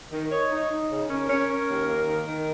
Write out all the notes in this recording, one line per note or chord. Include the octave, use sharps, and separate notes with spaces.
D#3
C#5 D#5
D#4
D#4
C#3
C#4 A#4
C#4
C#4
D#2
A#3
D#3
D#3